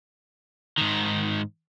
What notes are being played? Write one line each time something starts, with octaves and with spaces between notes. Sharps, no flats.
G#2 D#3